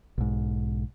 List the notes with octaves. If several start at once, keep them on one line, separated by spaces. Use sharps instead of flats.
B1 G#2